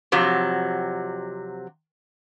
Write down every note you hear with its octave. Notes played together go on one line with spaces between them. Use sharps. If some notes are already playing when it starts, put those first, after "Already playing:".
F2 C3 F#3